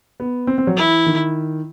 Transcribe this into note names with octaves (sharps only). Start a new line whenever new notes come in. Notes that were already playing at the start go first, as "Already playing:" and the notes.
B3
C4
C4
F#3
E3 E4
D#3